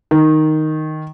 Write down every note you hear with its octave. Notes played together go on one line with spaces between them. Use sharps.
D#3